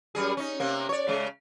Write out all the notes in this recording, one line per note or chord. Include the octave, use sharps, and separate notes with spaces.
F#2 G3 G#4
C#4 D#4
C3 A#3
C#5 D5
C#3 G#3